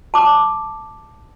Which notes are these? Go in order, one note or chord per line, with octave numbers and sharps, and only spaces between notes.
A5 D6